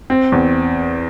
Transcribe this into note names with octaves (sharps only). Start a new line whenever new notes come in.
C4
E2